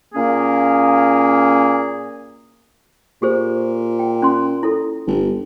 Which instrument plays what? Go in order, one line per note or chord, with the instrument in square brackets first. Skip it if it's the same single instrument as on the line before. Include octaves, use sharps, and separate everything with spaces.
[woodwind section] A#2 A#3 C#4 G#4
[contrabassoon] A#2 [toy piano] G4 G#4 C5
[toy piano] G5
C#4 C6
E4 A4
[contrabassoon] G1